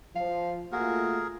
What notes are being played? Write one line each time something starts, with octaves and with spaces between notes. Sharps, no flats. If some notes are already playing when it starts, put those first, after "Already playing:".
F3 F5
A3 A#3 F4 F#4 G#4 A#4